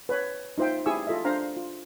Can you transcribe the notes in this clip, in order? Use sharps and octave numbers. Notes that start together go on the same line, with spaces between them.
B4 C#5
D#4 F4 C5 E5 G5
E4 G4 G#4 G#5 C#6 E6
F4 A4 D#5 E5
D4 C5 F5 A#5
F4